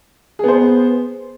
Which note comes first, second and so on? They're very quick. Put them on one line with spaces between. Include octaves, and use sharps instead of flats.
G#4 B3 C5